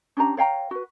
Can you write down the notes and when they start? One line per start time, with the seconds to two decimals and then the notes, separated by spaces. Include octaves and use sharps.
0.17 C#4 D4 G4 A#5
0.37 C#5 F5 G5 A#5
0.71 F#4 B4